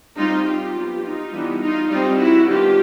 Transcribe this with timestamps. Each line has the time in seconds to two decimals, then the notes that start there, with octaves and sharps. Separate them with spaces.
0.16 G3 C4 D#4 F4
0.44 F4 G4
0.73 F#3 B3 D4
1.02 D#4 F4
1.31 E3 G3 B3 D4
1.59 D#4 F4
1.88 G3 C4 D#4 F4
2.17 E4 F#4
2.46 D#3 G3 B3 D4 F4 G4